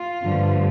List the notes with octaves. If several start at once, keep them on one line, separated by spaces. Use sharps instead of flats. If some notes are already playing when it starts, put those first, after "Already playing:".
Already playing: F4
G2 D3 F3 A3